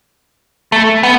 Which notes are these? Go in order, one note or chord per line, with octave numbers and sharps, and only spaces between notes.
A3
B3